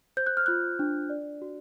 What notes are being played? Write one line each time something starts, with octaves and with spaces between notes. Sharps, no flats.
C5 G6
F#6
F6
F4 F#6
D4
D5
F#4